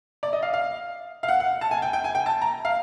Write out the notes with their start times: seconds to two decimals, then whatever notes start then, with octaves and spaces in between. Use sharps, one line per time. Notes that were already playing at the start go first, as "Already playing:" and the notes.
0.23 D5
0.33 D#5
0.43 F5
0.53 F5
1.23 F5
1.28 F#5
1.40 F#5
1.61 A5
1.71 G#5
1.82 G5
1.93 G5
2.04 G#5
2.15 G5
2.26 A5
2.42 A#5
2.65 F5